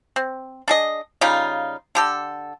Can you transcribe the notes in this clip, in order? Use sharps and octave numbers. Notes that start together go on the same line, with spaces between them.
C4
D4 G#4 D#5
C#3 G3 D#4 F4
D3 G4 A4